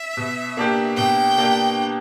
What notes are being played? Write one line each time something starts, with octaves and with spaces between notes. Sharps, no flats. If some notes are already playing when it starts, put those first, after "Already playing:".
Already playing: E5
B2
A#3 D4 G4
B2 G5
A#3 D4 G4